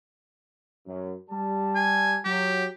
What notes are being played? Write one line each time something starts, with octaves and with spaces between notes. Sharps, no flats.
F#2
G3 A5
G#5
F#3 G4